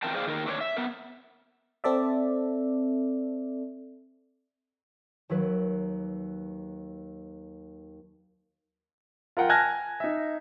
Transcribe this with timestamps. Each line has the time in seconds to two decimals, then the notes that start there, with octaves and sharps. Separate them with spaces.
0.03 E3 C4 A#4 G5 A5
0.14 G#4 C5 D5 F5
0.27 D#3 A#3 A#4
0.46 A3 D4 C5 C#5
0.61 E5
0.77 B3 A#4
1.84 C4 A4 D5 E5
5.29 D#2 F#3 B4
9.37 F4 A#4 F#5 G5
9.49 G#5 A5 F6 F#6 G#6 A#6
10.00 D#4 E5